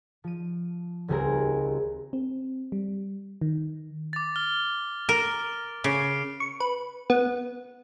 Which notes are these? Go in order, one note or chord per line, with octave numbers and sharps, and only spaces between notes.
F3 D#7
D#1 C#2 G3 C4 G#4 A#4
C4
G3
D#3
D6 A6
F6 G7
A#4
C#3 D6 C7 D7
C#6
B4
B3